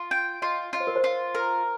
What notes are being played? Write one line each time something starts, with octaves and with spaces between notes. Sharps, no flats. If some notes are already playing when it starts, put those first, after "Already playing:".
Already playing: F4 F5
G5
F4 D#5
F4 D#5
C5
A#4
C5
F4
A#4